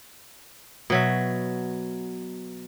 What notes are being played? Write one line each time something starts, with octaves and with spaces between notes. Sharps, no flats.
B2 F#3 E5